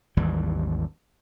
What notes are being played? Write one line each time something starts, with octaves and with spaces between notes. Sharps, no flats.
G#1 D#2 E3 G3